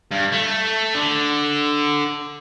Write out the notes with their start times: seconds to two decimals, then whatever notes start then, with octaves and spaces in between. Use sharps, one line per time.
0.11 G2
0.32 A3
0.95 D3